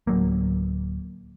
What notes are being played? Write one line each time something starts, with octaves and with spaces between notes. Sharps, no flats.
D1 F#3 A#3